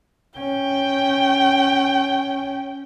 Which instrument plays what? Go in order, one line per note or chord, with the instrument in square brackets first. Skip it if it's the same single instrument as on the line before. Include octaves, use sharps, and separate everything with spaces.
[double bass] C#4 [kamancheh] G5